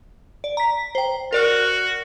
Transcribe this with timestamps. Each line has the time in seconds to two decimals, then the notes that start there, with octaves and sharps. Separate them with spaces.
0.44 D5
0.57 A#5 B6
0.95 C5 G5
1.33 F#4 A#4 D5 F6